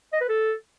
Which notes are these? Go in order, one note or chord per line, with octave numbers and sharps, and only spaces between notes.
D#5
B4
A4